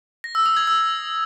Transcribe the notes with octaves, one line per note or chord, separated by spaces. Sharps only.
A#6
E6
D#6
G#6
E6